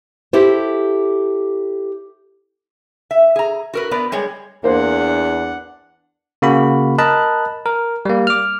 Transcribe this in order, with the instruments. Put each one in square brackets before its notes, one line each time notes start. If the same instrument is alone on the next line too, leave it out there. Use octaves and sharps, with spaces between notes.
[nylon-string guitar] E4 G4 A4 C5
[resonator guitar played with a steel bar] E5
G#4 A#5
F#4 A#4 B4
B3 A#4 B4 D5
G3 G#3 G#4 C#5
[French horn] E2 [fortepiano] A#3 C5 [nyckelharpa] D4 F#5
[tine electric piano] C#3 A#3 F#4 B5
A#4 D#5 A5 B5 F#6
A#4
G3 A#3
D6 F6